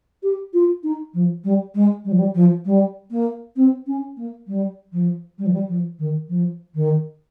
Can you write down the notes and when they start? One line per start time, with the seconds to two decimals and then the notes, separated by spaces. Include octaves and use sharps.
0.23 G4
0.53 F4
0.83 D#4
1.14 F3
1.44 G3
1.75 G#3
2.04 G3
2.11 F3
2.18 G3
2.35 F3
2.65 G3
3.11 A#3
3.56 C4
3.87 C#4
4.17 A#3
4.47 G3
4.92 F3
5.38 G3
5.46 F3
5.53 G3
5.68 F3
5.99 D#3
6.29 F3
6.74 D#3